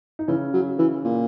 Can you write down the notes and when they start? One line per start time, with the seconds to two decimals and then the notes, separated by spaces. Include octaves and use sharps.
0.19 D#4
0.28 C#3 E3 C#4
0.53 F#3
0.79 E3
1.04 A#2